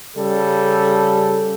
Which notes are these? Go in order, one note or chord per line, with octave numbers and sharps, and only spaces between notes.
C#3 G3 A4